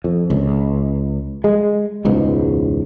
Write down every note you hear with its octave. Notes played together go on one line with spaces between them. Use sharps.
F2
C#2
G#3
E1 C#2 G#2 B2